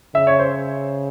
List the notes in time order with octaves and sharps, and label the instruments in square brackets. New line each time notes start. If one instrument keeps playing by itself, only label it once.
[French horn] C#3 [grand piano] E5
[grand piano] C#5
C5